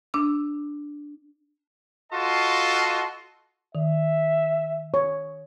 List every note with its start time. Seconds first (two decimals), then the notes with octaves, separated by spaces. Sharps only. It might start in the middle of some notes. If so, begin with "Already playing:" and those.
0.14 D4 E6
2.13 F4 F#4 A4 D#5 A5 C6
3.75 D#3 E5
4.94 C#5